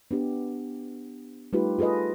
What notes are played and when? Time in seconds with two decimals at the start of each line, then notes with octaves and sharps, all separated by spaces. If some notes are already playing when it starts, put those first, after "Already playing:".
0.11 B3 D4 G4
1.53 G3 A3 D#4 F4 G4 B4
1.79 F4 G#4 A4 B4 D#5